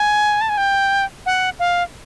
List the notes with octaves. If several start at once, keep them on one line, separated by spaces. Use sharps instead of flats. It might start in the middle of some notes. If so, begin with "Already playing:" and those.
Already playing: G#5
A5
G#5
G5
F#5
F5